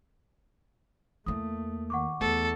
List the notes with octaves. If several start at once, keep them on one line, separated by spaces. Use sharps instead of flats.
E2 A3 A#3 D#6
D#3 F#5 C#6 D6
E2 A3 B3 A4